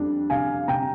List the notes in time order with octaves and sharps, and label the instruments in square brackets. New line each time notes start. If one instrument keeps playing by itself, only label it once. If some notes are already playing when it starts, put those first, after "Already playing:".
Already playing: [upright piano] F2 G3 D4
[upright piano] C3 [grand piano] F5 G#5
[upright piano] C3 [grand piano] G5 A#5